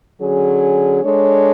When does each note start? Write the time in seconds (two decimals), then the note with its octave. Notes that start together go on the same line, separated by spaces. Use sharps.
0.20 D3 F#3 C#4 G#4
1.03 G#3 D4 A4 C#5